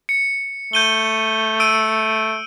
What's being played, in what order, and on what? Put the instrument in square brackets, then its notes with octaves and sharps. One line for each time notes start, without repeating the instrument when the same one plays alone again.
[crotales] C#7
[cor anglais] A3 [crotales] G6 D#7 G7
[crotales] E6 D7 D#7